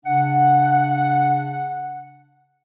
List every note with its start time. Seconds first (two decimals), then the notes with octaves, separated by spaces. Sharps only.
0.04 C#3 D4 F#5